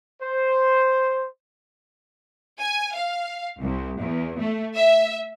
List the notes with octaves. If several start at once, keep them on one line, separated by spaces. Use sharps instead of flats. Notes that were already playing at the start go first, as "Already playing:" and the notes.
C5
G#5
F5
C2
E2
A3
E5